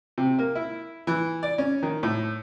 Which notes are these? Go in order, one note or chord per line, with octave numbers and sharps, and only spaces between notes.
C3
A#3
E4
E3
D5
C#4
D#3
A2